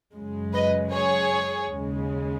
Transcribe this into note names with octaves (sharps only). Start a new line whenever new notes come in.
F#2 C#3 G#3
B4 D#5
G#4 C#5
D#2 C#3 G#3